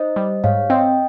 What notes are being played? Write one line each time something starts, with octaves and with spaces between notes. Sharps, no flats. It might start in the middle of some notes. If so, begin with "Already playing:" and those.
Already playing: D#4 C5 D#5
G3
G#2 C#5 F5
C4 D#5 G5